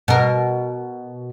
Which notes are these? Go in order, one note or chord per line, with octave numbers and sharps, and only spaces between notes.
B2 A#4